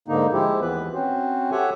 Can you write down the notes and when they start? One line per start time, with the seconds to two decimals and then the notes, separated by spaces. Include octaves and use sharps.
0.08 G#2 D3 A#3 D#4
0.33 F3 G#3 E4 G4
0.61 D#2 E3 B3 B4
0.93 C4 C#4 F#4 C5
1.51 G4 A4 C#5 E5 F#5 G#5